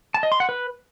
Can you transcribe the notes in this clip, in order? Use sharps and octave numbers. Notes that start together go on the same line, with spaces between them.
A5
D#5
C6
F#5
B4